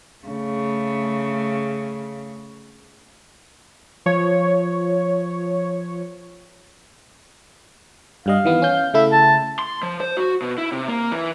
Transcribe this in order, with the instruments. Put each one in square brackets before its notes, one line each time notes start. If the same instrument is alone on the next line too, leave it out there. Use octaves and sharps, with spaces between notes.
[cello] C#3 A3
[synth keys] F3 C#5
[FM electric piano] G2 G3 D#5 [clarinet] F5
[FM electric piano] D#3 E3 B3
C#4 G6
[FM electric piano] C#3 A3 E4 [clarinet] E5
[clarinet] A5
[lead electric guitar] C6
F3
C5
F#4
B2
E4
C3
A#3
E3